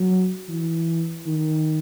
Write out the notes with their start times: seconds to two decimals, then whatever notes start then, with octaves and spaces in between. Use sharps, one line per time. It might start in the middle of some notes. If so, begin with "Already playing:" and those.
Already playing: F#3
0.49 E3
1.26 D#3